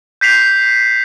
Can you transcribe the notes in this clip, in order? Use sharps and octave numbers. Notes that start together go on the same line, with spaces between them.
G6 B6 C7 F7